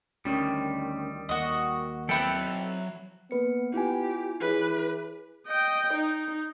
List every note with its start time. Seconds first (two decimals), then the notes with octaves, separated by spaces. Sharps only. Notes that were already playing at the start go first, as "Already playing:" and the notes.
0.25 D2 D#3 G3 C#4
1.29 D#2 A#3 F#4 D#5
2.09 F#3 C4 E4 A4 B4 G5 B5
3.31 A#3 B3 B4 C#7
3.74 E4 F4 G4 G#5
4.41 E3 E4 G#4 B4 C#5
5.47 D#5 G5
5.94 D#4